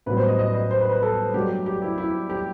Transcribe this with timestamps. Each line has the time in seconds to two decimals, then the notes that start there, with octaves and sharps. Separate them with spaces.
0.06 A1 G2 F#3 B3 B4
0.17 C5
0.28 D#5
0.39 D#5
0.54 D#5
0.71 C5
0.81 B4
0.91 B4
1.02 A4
1.34 G2 F#3 A3 G4
1.66 G4
1.82 E4
1.98 E4
2.30 G4